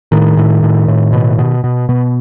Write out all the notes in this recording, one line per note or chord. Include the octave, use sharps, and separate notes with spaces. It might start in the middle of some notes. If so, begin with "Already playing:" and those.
A2 D#3
A2
A2
A2
B2
B2
B2
B2